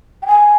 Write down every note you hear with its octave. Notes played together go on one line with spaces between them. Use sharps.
G5
G#5